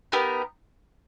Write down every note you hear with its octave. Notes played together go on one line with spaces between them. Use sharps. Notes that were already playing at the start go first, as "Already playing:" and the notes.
B3 D#4 G4 A#4